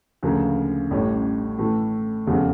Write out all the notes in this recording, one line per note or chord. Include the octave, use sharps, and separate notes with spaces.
D2 C#3 F3 A#3
A1 A2 G3 C#4
A2 E3 A3
F1 E2 C#3 F3